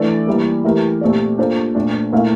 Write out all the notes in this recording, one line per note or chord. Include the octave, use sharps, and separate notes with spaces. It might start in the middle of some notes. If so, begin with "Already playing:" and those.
Already playing: E3 A3 D4 A4 D5
E3 G3 A#3
E3 A3 E4 G4 A#4
A#2 A3 C4 G4 D5
A#3 D4 F4 A4 C5
A#2 A3 D4
A#2 A3 E4 A#4 F5